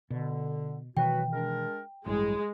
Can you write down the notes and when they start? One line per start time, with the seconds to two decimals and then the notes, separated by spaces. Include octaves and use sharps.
0.10 B2 D3
0.97 B2 D#3 E3 F#3 F#4 B4 G5
1.33 G#3 D4 A#4
2.06 A1 G2 F#3 G#3 E4